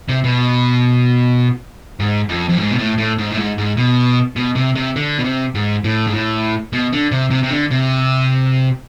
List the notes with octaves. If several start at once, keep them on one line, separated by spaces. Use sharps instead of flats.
C3
B2
G#2
F2
F2
G#2
B2
A2
A2
G#2
A2
G#2
G#2
B2
B2
C3
C3
D3
B2
C3
G#2
A2
G#2
A2
B2
D3
C3
C3
C3
D3
C3